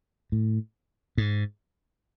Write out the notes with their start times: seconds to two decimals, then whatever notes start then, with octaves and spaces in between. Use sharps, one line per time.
0.32 A2
1.18 G#2